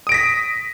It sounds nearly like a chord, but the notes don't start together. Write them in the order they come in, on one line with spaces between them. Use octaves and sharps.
D#6 D7 A#6 B6